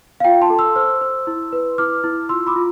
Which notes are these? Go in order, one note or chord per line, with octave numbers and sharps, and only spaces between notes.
F5
F4 G5
A5 C6
A4
C6 E6
C5
C5
E4
B4
E4 D6 F6
E4
F4 C6 E6
B5 D6
F4